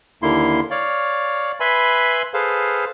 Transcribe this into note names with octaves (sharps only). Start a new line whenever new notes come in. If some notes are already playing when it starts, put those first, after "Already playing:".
D#2 D3 A#3 E4 C6
C#5 D5 F5
B4 E5 G#5 B5 C6
G#4 A4 B4 C5 F5